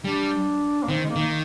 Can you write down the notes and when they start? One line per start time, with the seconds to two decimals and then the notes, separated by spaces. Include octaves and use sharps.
0.04 G3 D4
0.83 A#3
0.89 D#3 C4
1.04 G#3
1.10 A#3
1.16 D#3